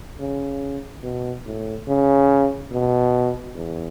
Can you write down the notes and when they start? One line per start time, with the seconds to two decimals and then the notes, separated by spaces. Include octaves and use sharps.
0.19 C#3
1.03 B2
1.45 A2
1.88 C#3
2.72 B2
3.55 E2